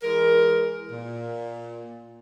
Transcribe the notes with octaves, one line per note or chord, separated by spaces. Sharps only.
E3 G#3 A#4
A#2